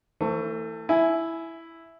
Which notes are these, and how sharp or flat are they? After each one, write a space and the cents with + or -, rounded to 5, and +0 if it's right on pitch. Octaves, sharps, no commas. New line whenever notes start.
E3 -15 A3 +30 C5 +0
E4 +0 G#5 +15